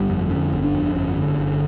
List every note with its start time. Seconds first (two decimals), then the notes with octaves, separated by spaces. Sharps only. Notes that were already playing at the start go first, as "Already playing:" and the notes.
Already playing: G1 G3
0.09 F2
0.30 D3 C#4
0.52 G1
0.63 D4
0.74 F2
0.95 G1 C#4
1.17 D3
1.39 G1